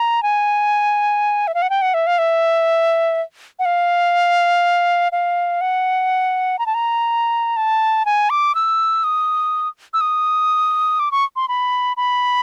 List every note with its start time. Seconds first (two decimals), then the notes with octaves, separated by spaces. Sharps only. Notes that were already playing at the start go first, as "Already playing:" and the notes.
Already playing: A#5
0.23 G#5
1.47 E5
1.54 F5
1.62 F#5
1.70 G5
1.82 F#5
1.94 E5
2.07 F5
2.18 E5
3.59 F#5
3.65 F5
5.12 F5
5.61 F#5
6.59 A#5
6.66 A5
6.74 A#5
7.57 A5
8.06 G#5
8.30 D6
8.55 E6
9.04 D#6
9.94 E6
10.01 D#6
11.00 D6
11.12 C#6
11.36 C6
11.48 B5
11.97 B5